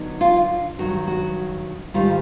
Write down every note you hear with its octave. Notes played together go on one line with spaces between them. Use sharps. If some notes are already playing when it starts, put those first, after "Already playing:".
Already playing: D3 F#3 B3 D#4
F4
G2 D#3 F#3 F#4
F#4
G#2 D#3 G3 F4